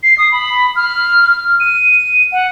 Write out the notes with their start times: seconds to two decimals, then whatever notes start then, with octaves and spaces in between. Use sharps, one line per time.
0.03 C7
0.18 D#6
0.32 B5
0.76 F6
1.23 F6
1.60 D#7
2.32 F#5